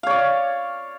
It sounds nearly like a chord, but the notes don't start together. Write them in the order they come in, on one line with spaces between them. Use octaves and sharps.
F5 C#5 D5